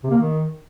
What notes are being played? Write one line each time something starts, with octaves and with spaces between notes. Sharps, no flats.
C3
A#3
D#3